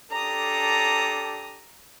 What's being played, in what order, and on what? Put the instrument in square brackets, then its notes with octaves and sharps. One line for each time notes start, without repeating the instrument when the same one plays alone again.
[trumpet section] D4 G4 A4 [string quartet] A#5 D#6